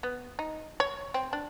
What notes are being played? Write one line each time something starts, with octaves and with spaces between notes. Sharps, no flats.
B3
D#4
C#5
C4
D4